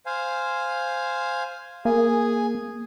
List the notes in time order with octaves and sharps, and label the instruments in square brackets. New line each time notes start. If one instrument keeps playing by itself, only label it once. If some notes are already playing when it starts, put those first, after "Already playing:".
[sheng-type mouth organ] C5 F5 G#5
[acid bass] A#3 [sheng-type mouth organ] G#4 G#5